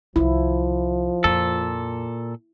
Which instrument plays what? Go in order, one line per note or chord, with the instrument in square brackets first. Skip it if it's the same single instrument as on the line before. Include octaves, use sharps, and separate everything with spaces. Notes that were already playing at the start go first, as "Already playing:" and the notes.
[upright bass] C2 D#3 [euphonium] F3 [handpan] E4
[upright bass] F2 [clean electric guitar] A#2 A4